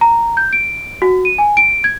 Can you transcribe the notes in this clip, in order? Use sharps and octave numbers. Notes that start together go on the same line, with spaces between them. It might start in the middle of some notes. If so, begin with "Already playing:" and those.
A#5
G6
D7
F#4
D#7
G#5
D7
G#6